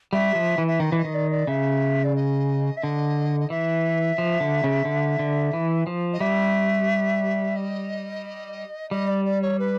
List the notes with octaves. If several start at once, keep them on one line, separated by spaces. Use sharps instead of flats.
G3 E5
F3
E3
E5
D#3 D#5
E3
D#5
D#3
D5
D5
C#3 E5
D5
D#5
E5
D3 D#5
D#5
E3 E5
F3
D3
C#3
D3
D3
E3
F3
D#5
G3 E5
D#5
G3 D#5
D5
D5
C#5
B4